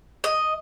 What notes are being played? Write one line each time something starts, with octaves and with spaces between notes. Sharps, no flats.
D#5